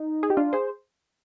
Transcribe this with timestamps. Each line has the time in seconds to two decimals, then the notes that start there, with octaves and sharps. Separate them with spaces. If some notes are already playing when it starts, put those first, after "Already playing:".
Already playing: D#4
0.23 G#4
0.30 G4
0.37 D4 F4
0.53 G#4 C5